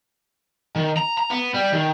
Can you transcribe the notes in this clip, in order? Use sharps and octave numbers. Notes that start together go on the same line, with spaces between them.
D#3
A#5
A#5
B3
G3
D#3